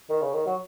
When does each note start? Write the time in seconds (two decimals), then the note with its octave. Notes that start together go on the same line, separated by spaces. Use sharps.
0.10 D#3
0.22 C#3
0.33 D#3
0.46 F#3